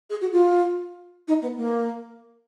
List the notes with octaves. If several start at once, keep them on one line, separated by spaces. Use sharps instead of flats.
G#4
F#4
F4
D#4
B3
A#3